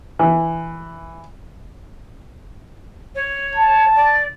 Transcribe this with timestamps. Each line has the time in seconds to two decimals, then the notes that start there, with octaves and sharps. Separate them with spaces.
0.19 E3
3.14 C#5
3.55 A5
3.95 D5